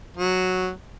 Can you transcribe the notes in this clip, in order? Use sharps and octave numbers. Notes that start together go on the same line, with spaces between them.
F#3